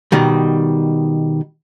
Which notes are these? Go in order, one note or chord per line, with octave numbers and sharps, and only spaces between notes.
B2 D#3 G3